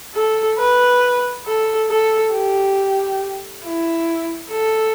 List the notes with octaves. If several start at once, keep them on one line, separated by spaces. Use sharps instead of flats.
A4
B4
A4
A4
G4
E4
A4